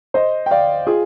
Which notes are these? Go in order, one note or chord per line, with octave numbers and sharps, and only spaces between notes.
C5 D#5
G5
D5 F5
F4 G#4